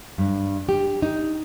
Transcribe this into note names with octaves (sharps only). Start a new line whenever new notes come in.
G2
G4
D#4